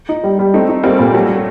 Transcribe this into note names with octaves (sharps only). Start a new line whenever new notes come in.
D#4
G3
G3
A3 C4 D#4
D#4
G3 A#3 C4
A#2
F#3 G3 A3